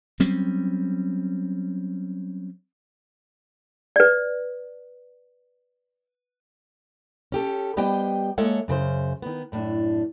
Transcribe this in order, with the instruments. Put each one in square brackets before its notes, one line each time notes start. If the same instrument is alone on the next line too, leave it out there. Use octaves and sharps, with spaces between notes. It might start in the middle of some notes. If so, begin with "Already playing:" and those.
[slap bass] F#3 G3 C4 C#4
[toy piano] B4 D5
[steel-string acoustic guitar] C#4 G4 A4
G3 B3 G4 C5 D#5 G5
G#3 A#3 A4 C#5 E5 F#5
F#2 C#3 G#4 C5
D#3 B3
F#2 A2 D4